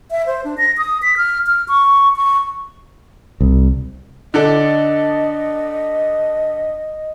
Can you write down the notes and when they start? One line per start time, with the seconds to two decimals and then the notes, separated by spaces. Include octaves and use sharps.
0.11 E5
0.27 C5
0.45 D4
0.58 A#6
0.78 D#6
1.02 B6
1.17 F6
1.47 F6
1.68 C#6
2.16 C#6
3.41 C2
4.34 D3 D4 A4 D#5